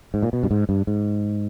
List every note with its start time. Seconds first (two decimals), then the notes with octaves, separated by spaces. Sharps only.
0.14 G#2
0.23 A#2
0.33 B2
0.43 G2
0.51 G#2
0.69 G2
0.87 G#2